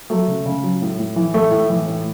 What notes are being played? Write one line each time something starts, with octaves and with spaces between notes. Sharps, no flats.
F#3 A3
C#3
C#3
F#3
A2
A2
E3
A2 A3
A2
E3
A2